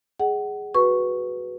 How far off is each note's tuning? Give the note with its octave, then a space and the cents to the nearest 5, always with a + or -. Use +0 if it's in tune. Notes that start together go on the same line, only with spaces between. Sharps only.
G#4 +0 D#5 +0 F#5 +25
F#4 +0 B4 +0 C#6 +0